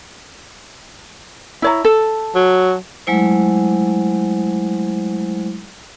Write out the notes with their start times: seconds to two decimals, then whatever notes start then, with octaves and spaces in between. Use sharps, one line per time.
1.62 E4 C#5 A#5
1.85 A4
2.36 F#3
3.07 F#3 G#3 A3 E4 C5